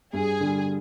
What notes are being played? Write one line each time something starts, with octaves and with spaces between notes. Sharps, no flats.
G2 G#4
D3 G3